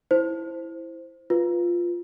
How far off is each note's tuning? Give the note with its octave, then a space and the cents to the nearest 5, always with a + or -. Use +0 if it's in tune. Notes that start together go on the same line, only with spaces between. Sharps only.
E4 +0 C5 +0
F4 +0 B4 +0